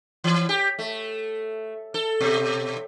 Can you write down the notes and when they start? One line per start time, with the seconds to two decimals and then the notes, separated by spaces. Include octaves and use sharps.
0.24 E3
0.49 G4
0.79 A3
1.94 A4
2.21 B2